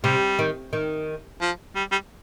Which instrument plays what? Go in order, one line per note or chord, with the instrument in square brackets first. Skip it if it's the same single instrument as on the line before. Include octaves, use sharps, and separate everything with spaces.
[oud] C3 [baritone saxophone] G3
[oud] D#3
D#3
[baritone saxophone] F3
G3
G3